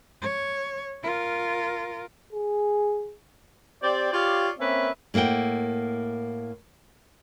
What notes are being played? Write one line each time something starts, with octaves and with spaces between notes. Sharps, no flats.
C#5
F4 A#4
G#4
C4 G4 C5 D5
F4 G4 C#5 D5 F5
A#3 C4 C#4 B4 E5
A2 A#3 E4 F#5 G5